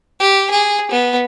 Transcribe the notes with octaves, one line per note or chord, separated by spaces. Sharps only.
G4
G#4
B3